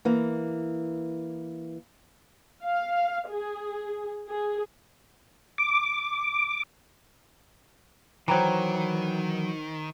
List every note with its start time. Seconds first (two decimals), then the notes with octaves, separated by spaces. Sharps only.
0.05 E3 A#3
2.63 F5
3.30 G#4
4.29 G#4
5.58 D6
8.28 D#3 E3 F#3 C5 G5 A#5